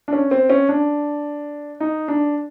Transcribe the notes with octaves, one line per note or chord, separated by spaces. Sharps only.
D4
C#4
C4
C#4
D4
D#4
D4